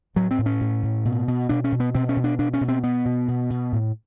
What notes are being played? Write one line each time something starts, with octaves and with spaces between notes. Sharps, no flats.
A2 F#3
C4
A2
C#4
A2
A2
B2
B2
B2 D4
C#4
B2
B3
B2 C4
C#4
B2
D4
B2 D4
C#4
B2
C4
B2 B3
B2
B2
B2
A2